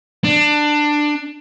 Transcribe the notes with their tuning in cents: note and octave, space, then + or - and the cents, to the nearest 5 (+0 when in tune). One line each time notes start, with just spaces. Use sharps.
D4 +15